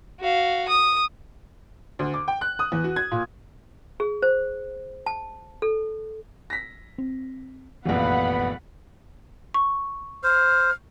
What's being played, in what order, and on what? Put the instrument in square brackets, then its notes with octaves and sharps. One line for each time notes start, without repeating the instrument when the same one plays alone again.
[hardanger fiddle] F#4 F5
D#6
[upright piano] D2
D6
G5
F#6
D#6
E2
F#4
G#6
A#2
[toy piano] G#4
C5
A5
A4
[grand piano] A#6 B6
[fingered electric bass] C4
[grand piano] F1 A#1 [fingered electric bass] F#2 E3 [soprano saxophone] B3 [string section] F5 F#5 B5
[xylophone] C#6
[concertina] C5 [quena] F6